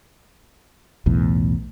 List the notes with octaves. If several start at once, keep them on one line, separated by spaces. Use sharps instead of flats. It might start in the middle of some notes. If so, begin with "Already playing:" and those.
B1 E2 A2